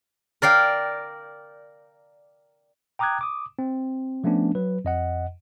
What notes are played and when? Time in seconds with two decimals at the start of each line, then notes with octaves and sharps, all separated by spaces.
0.42 A#4 D5 F5 G5
2.99 G5 A#5 D6 D#6 F#6 G#6
3.21 D6 D#6
3.59 C4
4.24 F3 A3 B3 C#4 D4
4.55 F#3 B4
4.85 F2 D#5 F#5